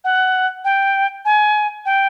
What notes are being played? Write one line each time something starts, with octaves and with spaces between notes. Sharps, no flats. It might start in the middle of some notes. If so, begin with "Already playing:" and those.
F#5
G5
G#5
G5